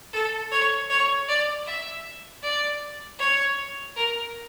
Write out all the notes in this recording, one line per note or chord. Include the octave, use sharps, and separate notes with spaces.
A4
C#5
C#5
D5
E5
D5
C#5
A#4